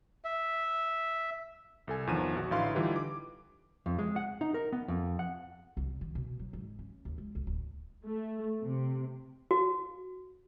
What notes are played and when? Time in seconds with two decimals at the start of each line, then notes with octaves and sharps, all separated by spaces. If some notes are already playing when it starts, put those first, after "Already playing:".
0.24 E5
1.87 C2 A4 G#5
2.07 G1 E2 D#3 F3 D#7 E7
2.35 A#1 F#4
2.51 A1 D3 E4 F5 C6
2.75 D3 E3 G3 D#4 F4 G4
2.96 D6
3.86 F2
3.99 G#3
4.16 F#5
4.41 D#4
4.54 A#4
4.72 B3
4.88 F2
5.19 F#5
5.77 C2
6.01 D#3
6.15 B2
6.39 F#3
6.53 G#2
6.79 C#4
7.05 D#2
7.18 G#3
7.35 B1
7.47 D1
8.05 A3
8.62 C3
9.51 F#4